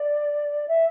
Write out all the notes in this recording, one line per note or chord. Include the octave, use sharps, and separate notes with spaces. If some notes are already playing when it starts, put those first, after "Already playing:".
Already playing: D5
E5